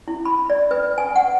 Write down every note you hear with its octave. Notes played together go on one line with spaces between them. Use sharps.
E4
B5
D5
B4
G#5
F#5